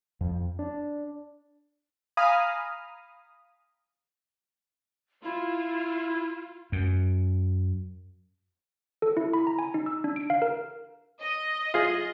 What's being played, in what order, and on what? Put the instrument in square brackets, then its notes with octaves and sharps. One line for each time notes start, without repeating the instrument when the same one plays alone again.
[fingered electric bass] F2
D4
[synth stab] F5 G#5 A#5 B5 D#6 F6
[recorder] E4 [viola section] F4
[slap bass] F#2
[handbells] A4
E4
B5
A#5
G#5
D#4
E6
D4
D7
F5
A#4
[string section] D#5
[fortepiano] F4 G#4